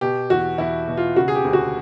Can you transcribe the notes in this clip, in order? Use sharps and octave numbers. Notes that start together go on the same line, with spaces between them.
B2 G4
E2 F#4
E2 E4
B2
F4
C#3 F#4
G#4
G4
D2
F#4